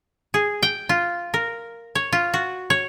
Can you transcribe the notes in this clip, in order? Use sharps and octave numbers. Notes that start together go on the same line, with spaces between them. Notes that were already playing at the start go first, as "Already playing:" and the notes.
G#4
G5
F4
A#4
C#5
F4
F#4
C#5